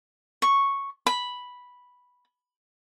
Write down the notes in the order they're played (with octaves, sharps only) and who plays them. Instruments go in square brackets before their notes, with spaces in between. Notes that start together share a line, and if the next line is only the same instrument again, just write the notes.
[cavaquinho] C#6
B5